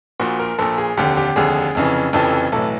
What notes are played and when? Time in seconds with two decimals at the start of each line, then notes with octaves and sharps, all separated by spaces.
0.20 A#1 A#2 F#4
0.39 A#4
0.58 A#1 A#2 A4
0.78 G#4
0.97 F1 D#2 D3 G4
1.17 G4
1.36 F1 D#2 D3 G#4
1.75 F1 F2 C#3 E3
2.13 F1 F2 C#3 E3 A4
2.52 B1 A2 E3 A4